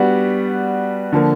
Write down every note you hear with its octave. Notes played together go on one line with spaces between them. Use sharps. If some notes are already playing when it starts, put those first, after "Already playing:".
Already playing: G3 B3 D4 F#4
D3 F3 A#3